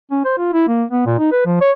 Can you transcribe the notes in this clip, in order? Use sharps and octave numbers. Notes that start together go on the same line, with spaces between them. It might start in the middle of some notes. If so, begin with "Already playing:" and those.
C#4
C5
F4
E4
A#3
B3
A#2
D#4
B4
F3
C#5